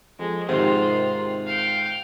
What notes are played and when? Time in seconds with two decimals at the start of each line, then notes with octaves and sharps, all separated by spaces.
0.19 F2 G#3
0.49 G#2 C3 D#3 F4
1.47 F5 G5